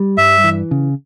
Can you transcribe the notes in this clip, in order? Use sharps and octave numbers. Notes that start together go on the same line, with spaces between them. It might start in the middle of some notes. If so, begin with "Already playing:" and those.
Already playing: G3
G2 E5
E3
C#3